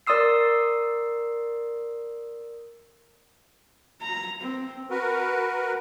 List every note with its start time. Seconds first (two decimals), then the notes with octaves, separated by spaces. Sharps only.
0.07 A#4 D5 C6 D#6 E6 C7
4.02 A#5
4.41 C4
4.90 F#4 A#4 B4